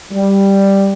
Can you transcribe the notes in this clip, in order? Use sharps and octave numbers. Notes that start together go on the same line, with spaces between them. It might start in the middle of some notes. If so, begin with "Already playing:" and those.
G3